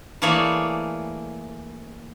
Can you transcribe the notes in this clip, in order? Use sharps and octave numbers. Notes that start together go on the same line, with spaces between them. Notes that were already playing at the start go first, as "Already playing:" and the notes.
E3 A3 A#3 G#4 C#5 D5